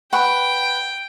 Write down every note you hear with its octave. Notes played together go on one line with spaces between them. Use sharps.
B4 F#5 G5 C#6